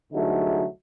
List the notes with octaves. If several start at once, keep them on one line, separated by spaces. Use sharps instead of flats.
C2 D3 F#3 A3 D#4 G#4